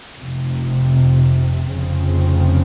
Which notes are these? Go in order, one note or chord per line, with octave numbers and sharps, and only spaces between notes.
F1 F2 C3
F1 F2 C#3 F3 C4